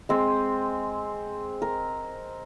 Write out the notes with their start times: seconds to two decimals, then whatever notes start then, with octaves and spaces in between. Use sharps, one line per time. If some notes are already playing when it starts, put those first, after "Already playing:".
0.09 G#3 C4 C5
1.62 A#4